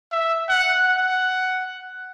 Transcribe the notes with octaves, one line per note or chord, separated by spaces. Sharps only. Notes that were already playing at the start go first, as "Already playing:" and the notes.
E5
F#5
F#5